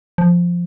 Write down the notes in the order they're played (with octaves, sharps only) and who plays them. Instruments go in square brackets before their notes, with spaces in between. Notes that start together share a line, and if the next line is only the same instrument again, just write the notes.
[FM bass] F3